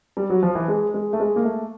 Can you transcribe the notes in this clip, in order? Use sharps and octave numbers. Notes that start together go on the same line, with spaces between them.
G3
F#3
F3
E3
G#3
G#3
A3
G#3
A#3
A3